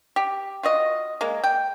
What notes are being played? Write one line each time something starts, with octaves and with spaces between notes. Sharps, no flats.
G4
F4 F#4 D#5
G#3 A#3
G5